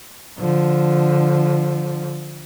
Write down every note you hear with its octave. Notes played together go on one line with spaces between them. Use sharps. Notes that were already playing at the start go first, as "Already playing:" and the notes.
D3 F3